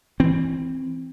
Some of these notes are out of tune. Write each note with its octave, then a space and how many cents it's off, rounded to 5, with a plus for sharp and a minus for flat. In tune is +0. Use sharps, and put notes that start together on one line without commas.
E3 -5 C4 +0